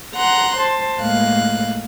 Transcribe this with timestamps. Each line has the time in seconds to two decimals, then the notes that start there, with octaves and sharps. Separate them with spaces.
0.15 F#5 A#5 C6 F#6
0.58 C5 A5
1.00 A2 G#3 A#3 F5 F#6